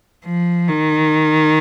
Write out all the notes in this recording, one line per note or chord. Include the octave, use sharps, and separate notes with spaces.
F3
D#3